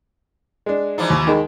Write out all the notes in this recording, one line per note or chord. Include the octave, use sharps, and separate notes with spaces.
G#3 D4
E3 F3 D#4
D#2
D#3 G#3